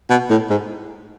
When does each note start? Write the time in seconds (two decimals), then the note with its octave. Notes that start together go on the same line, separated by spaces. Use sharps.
0.10 B2
0.30 A2
0.50 G#2